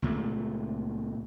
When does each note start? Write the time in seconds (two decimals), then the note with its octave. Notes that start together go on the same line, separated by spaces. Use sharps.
0.02 C#2 A#2 A3